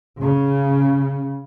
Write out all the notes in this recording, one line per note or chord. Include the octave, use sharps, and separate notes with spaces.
C#3